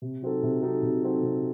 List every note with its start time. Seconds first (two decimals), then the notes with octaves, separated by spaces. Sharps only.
0.02 C3
0.22 F#3 C4 D#4 A4
0.43 C3
0.63 F#3 C4 D#4 A4
0.83 C3
1.02 F#3 C4 D#4 A4
1.23 C3